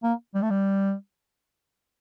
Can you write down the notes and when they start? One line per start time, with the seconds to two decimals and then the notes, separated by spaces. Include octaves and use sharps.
0.04 A#3
0.35 G3
0.42 A3
0.50 G3